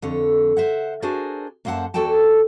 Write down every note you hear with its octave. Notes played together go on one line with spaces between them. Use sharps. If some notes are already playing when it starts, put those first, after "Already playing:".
F2 D3 C#5
C5 E5 F#5
D4 F#4 G#4 A#4 C5 D5
F#2 A#3 C5 E5 F#5 A5
E2 F#4 A4 D5 G5 A5